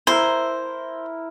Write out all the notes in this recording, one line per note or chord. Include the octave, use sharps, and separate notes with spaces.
E4 A#4 C5